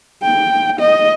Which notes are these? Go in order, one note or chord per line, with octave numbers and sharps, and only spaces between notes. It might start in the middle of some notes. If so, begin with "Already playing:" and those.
G5
D#5